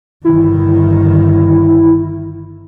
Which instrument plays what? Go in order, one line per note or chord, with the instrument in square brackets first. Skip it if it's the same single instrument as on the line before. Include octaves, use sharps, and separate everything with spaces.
[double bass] G1 D#3 [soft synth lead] E4